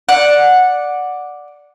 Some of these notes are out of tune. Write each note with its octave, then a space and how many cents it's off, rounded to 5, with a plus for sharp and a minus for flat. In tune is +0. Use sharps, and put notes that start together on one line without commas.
D5 +0 F#5 -10